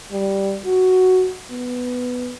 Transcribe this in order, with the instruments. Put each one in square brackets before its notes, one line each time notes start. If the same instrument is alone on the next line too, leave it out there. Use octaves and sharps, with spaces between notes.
[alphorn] G3
F#4
B3